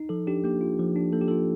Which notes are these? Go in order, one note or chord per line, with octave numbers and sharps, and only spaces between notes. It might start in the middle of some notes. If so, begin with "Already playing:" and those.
Already playing: D#4
F3 A4
D4 G4
A#3 G4
F4
F3
D4
A#3 A4
G4
F4 A4